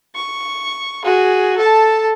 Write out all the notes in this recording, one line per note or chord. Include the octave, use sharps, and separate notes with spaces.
C#6
F#4 G#4
A4 A5